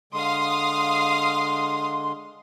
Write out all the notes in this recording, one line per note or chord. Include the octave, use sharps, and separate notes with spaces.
D3 G#3 F5 C6 D#6